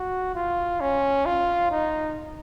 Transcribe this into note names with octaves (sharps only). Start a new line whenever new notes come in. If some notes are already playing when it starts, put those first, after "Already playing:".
Already playing: F#4
F4
C#4
F4
D#4